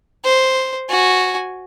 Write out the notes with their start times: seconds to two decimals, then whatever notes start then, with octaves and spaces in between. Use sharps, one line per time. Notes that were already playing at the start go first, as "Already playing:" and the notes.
0.25 C5
0.89 F#4 G#5